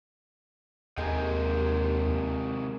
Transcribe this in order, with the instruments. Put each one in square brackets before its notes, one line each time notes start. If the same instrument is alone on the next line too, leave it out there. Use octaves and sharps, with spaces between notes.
[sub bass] D#2 [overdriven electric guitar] C3 G#3 [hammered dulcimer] D#3 G#4 G5